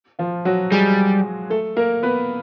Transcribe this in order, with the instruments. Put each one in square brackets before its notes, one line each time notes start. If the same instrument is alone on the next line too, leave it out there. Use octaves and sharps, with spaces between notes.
[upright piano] F3 F4
F#3 F#4
[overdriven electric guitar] G3 [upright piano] G#3 G#4
[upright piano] A3 A4
A#3 A#4
B3 B4